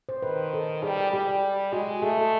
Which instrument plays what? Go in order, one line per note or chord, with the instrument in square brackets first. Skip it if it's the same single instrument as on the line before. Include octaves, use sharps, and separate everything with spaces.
[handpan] C5
[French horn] D#3 [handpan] B4
[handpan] A4
[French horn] G3 [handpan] G#4
[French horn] G3 [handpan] G4
[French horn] G#3 [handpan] F#4
[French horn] A3 [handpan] G#4
[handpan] A4